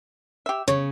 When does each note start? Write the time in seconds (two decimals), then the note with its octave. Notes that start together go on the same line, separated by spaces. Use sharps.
0.46 G4 E5
0.68 C#3 C#5